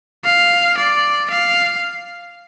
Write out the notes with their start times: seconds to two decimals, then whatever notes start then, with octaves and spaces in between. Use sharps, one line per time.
0.25 F5
0.77 D5
1.30 F5